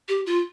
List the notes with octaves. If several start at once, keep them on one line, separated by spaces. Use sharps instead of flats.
G4
F4